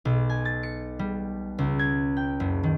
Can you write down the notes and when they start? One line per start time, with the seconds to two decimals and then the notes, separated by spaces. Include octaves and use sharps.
0.05 B1
0.29 G#5
0.45 A6
0.63 C#7
0.99 G3
1.58 C#2
1.79 G#6
2.17 G5
2.40 F#1
2.63 D#3